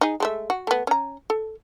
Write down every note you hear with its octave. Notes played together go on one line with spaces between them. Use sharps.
D#4 G#4
G#3 A3 E5
F#4
A3 B3
C#4 A#5
A4